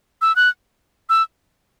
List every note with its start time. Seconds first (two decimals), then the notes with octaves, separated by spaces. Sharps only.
0.22 E6
0.36 F#6
1.09 E6